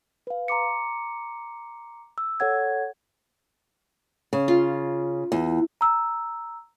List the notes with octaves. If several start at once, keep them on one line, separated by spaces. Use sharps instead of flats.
B4 F5
A#5 C6 D6 C#7
E6
A4 C#5 F#5 G#6
C#3
F4
E2
A#5 E6